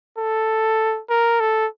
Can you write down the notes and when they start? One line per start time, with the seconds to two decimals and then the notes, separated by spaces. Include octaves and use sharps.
0.18 A4
1.10 A#4
1.40 A4